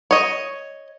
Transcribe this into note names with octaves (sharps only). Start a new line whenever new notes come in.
C#5 D#5